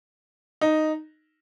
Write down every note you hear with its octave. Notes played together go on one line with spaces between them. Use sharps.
D#4